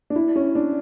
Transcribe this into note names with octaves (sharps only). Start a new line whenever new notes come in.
D4
E4
C#4
D4